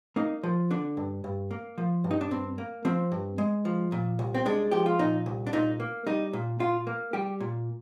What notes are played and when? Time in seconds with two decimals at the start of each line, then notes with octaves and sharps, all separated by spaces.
0.16 A#3 D#4
0.43 F3
0.71 D3 D4
0.97 G2
1.24 G2
1.51 A#3
1.78 F3
2.04 G2
2.11 D#4
2.21 D4
2.31 G2 C4
2.58 A#3
2.85 F3 C4
3.12 G2
3.38 G#3
3.65 F3
3.92 A#2
4.19 C2
4.34 C4
4.45 G#3 D4
4.71 F3 G4
4.86 F4
4.99 A#2 D#4
5.26 C2
5.47 D4
5.53 A#2 D#4
5.80 A#3
6.07 G3 D#4
6.33 A#2
6.60 A#2 F4
6.87 A#3
7.13 G3 G4
7.40 A#2